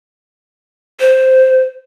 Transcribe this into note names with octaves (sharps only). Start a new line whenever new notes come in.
C5